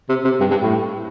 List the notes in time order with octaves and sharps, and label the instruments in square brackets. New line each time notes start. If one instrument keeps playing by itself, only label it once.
[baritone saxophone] C3
C3
G2
G2
A2